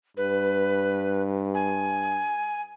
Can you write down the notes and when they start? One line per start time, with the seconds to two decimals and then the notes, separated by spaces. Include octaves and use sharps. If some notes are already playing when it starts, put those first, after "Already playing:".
0.17 G2 B4
1.54 G#5